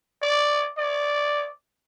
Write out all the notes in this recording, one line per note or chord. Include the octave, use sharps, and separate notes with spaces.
D5
D5